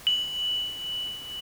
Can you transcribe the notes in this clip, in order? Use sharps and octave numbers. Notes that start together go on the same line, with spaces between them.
F#7